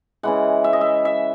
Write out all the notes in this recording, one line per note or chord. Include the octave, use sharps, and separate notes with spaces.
C#3 E3 G#3 F#5
E5
D#5
E5
E5